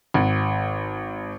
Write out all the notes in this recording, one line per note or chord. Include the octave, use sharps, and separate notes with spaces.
G#1